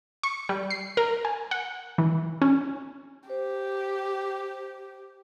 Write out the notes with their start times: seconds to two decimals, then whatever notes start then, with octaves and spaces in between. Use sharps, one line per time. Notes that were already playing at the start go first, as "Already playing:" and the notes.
0.23 C#6
0.49 G3
0.70 C7
0.97 A#4
1.25 G#5
1.51 F#5
1.98 E3
2.42 C#4
3.30 G4 C5